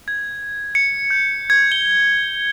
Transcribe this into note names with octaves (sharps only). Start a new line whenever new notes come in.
G#6
C#7
G6
G#6
G7